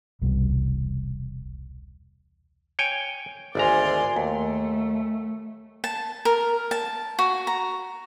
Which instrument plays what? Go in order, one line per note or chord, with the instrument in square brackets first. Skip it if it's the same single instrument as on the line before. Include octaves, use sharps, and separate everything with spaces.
[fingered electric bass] E1 C2 G3
[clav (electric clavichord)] C#5 G5 G#5
[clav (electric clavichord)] G#1 D2 A#5 [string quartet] D5 G#5 C6
[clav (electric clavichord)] D#2 [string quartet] A3
[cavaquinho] A5
A#4
A5
F#4
A#5